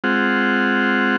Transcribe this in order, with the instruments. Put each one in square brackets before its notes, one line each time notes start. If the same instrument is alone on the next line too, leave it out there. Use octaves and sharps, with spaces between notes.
[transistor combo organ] G#3 C4 F4 F#5